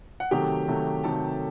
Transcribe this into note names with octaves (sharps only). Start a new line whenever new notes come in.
F#5
C3 D#3 F#3 A3 G4 G5
C3 D#3 F#3 A3
C3 D#3 F#3 A3 A4 A5